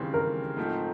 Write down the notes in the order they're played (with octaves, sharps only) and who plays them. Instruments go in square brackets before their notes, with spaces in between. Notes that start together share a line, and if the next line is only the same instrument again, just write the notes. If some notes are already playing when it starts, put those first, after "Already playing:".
Already playing: [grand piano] D#2 C#3 E3 G3 C4
[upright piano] A#4
[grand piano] G#2 F3 A3 C4